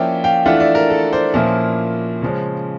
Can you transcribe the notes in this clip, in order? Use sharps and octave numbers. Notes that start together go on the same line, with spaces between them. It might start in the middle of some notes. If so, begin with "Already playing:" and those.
Already playing: F3 A#3 C#4 E4 D5 E5 G5
F5 G5
E3 A3 D4 F4 E5 F#5
D5 E5
A#4
A4
C5 D5
A#2 F3 A#3 C#4 E4
C#3 F3 G#3 C#4